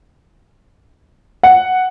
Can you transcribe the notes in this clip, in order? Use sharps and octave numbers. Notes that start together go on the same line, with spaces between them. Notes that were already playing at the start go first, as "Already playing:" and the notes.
F#5